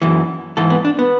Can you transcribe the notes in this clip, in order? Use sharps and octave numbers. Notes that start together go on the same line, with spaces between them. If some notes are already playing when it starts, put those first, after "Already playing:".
F#2 E3
G#2 E3 A4
B3
D4
B3